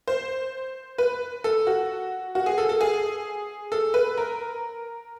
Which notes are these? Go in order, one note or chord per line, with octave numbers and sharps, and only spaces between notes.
C5
B4
A4
F#4
F#4
G#4
A4
A4
G#4
A4
B4
A#4